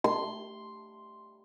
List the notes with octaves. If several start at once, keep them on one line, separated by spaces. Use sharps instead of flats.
C6